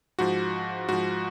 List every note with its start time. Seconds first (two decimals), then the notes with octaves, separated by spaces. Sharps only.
0.19 G#2 F3 F#4
0.89 G#2 F3 F#4